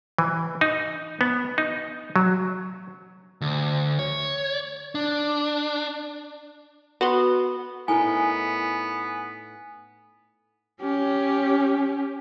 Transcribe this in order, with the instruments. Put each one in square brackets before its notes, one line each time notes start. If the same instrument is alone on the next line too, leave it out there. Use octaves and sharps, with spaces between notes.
[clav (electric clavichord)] E3
D#4
B3
D#4
F#3
[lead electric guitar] D2
C#5
D4
[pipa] B3 [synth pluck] F#4 B5 C6
[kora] A2 D#4 A#4 [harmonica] B3 [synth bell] G#5
[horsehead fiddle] C#4 G4